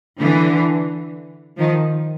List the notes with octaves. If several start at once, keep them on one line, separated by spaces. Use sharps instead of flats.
D3 E3
D#3 F3